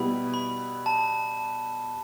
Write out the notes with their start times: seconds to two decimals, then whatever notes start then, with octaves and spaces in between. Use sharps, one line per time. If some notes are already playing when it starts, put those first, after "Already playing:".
Already playing: B2 G3 B3 E4 B5
0.34 B5
0.86 A5